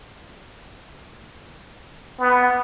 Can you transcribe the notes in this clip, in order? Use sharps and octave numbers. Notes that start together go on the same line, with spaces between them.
B3